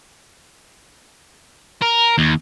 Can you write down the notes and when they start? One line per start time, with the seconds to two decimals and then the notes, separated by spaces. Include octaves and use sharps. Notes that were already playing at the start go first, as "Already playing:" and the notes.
1.82 A#4
2.18 D#2